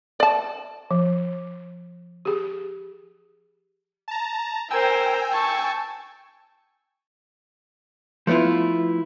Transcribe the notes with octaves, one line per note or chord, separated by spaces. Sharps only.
D5 A5
F3
G4 G#4
A5 A#5
A#4 C5 G5 G#5 E6
A5 C#6
F3 A3 B3 E4 F4